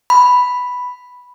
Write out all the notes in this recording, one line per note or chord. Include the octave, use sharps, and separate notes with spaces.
B5